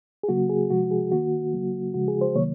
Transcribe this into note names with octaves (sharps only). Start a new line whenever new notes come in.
G#4
C#3 F#3 A#3 F#4
G#4
C3 F3 G#3 F#4
G#4
D#3 A#3 F#4
C#3 F#3 A#3
C#3 F3 G#3 F#4
G#4
C5
C3 D#3 F#3 A#3 C#5